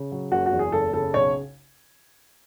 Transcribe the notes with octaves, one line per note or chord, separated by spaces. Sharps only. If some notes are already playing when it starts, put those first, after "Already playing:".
Already playing: C#3
F#3
F#1 F#4
F#4
E2
G#4
F#1 A4
C#3 A4
B1 C#5